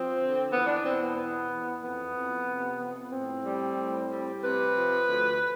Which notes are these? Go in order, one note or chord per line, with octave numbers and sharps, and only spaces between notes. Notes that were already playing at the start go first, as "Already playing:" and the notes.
Already playing: F3 C4
D3
E2 B3
D4
B2 C4
B3
E2 B3
E2
F2 B3
F2
C3
F2
A2 C4
G3
A2
G3
C3 B4
F3
D2